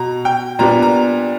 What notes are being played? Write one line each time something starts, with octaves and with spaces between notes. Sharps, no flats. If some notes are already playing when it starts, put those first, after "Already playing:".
Already playing: B2 A#5
G5
A#2 G3 B3 D4 A#5
A#5